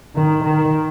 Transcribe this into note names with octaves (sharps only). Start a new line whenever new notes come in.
D#3
D#3